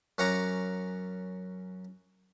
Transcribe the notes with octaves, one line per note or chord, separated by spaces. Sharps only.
F#2 C#4 F#5 A#5 D6